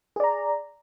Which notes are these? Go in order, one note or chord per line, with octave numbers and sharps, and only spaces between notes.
G#4 D5 A#5